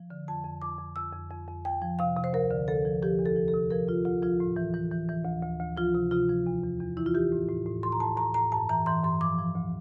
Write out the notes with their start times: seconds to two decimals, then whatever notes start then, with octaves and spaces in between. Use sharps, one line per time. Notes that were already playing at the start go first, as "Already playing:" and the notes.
Already playing: F3
0.10 D3
0.28 F2 A5
0.44 F2
0.62 F2 D6
0.79 F2
0.96 F2 E6
1.13 F2
1.31 F2
1.48 F2
1.64 F2 G5
1.82 F3
1.99 C3 F5
2.17 C3
2.24 C5
2.33 D2 A#4
2.51 D3
2.68 D2 A4
2.85 F3
3.02 F3 G4
3.19 E2
3.26 A4
3.36 F3
3.48 A4
3.53 C3
3.71 F3 A#4
3.88 F3 F4
4.05 D2 F4
4.22 F3 F4
4.40 A2
4.56 E3
4.74 E3
4.91 E3
5.09 E3
5.25 D2
5.43 D2
5.60 D2
5.77 F3 F4
5.95 C3
6.11 C3 F4
6.29 F3
6.46 E2
6.64 E2
6.80 E2
6.97 E3 E4
7.06 F4
7.14 E3 G4
7.32 A2
7.49 A2
7.66 A2
7.83 A2 C6
7.92 A#5
8.00 A2 A5
8.17 A2 A#5
8.34 A2 A#5
8.52 G2 A5
8.69 E3 A#5
8.86 E3 C6
9.03 G2 C6
9.21 F3 D6
9.38 F3
9.55 D2